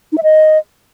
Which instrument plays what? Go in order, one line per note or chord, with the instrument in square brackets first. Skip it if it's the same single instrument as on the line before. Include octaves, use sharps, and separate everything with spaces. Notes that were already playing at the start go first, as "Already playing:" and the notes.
[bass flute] D#4
E5
D#5